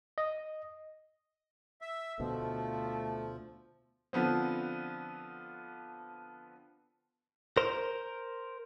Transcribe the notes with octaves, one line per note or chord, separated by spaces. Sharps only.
D#5
E5
D2 B2 F3 A3
D3 F3 B3 C4
A#4 C5